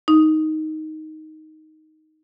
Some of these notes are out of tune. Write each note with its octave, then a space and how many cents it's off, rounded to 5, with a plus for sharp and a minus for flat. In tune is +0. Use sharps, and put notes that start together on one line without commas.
D#4 +5